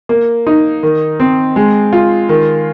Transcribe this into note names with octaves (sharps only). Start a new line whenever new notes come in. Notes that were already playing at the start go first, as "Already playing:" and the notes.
A#3
D#4
D#3
C4
G#3
F4
D#3